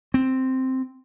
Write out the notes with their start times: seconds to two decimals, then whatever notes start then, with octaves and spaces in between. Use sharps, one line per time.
0.14 C4